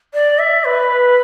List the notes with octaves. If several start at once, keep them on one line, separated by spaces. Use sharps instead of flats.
D5
E5
B4